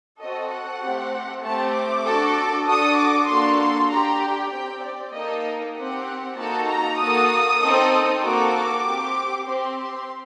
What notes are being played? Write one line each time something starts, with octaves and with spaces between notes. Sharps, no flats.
C4 F#4 A4 D#5
F#5
A3 C4 G4
A3 C4 G4 A5
D6
D4 F#4 A4
D4 F#4 A4 D#6
D6
A#3 D4 F#4 A4 C6
C6
D4 G4 A#5
G5
C4 G4 G5
D5
A#3 D#4 A4 D#5
C4 G4 F#5
A#3 D#4 F#4 A4 A5
A#5
A#3 F#4 A4 D#6
C4 D#4 A4
A#3 F#4 A4 D6
C4 G4
C4 G4 C6
C6